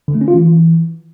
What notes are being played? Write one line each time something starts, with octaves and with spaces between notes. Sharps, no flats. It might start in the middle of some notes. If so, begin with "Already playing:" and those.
D3
A3
C#4
F4
E3